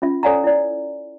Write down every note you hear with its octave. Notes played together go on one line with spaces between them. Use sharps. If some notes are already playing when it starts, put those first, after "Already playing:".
C#4 F4 E5
A4 C#5 D5 F#5 G#5 A#5
E4 D5